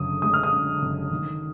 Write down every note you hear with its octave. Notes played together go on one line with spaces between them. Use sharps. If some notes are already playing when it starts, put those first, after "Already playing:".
Already playing: F#1 F#2 D3 D#6
G#3 D#6
F6
D#6
D3
F#1
D#3